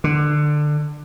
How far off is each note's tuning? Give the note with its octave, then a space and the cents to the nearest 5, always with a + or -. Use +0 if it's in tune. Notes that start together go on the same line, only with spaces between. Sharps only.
D3 +20